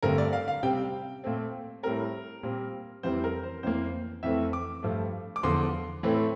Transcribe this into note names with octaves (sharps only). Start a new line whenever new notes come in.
G2 D3 A3 C4 A#4
D5
F5
F5
C3 G3 C4 G5
A#2 A3 C4
A2 G3 C4 A#4
A#2 G3 C4
F2 E3 G3 C4 C5
A#4
C5
F2 E3 A#3 C5
F2 E3 A3 C4 E5
D6
G2 F3 A3
D6
E2 D3 F3 C6
A2 E3 A3 C4